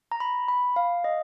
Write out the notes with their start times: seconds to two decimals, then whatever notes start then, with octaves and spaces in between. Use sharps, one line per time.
0.12 A#5
0.20 B5
0.48 B5
0.76 F5
1.04 D#5